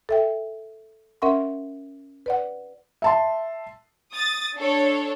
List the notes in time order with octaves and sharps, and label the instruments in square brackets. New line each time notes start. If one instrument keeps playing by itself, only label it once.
[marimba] A4 E5 G5
C#4 A#4 E5 F#5 C6 C#6
B4 D5 F#5
[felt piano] E5 A5 C6
[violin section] D#6 A6
D4 A4 C#5